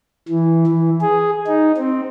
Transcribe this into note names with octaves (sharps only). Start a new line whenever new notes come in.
E3
E3
G#4
D#4
C4